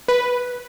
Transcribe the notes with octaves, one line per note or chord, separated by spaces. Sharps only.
B4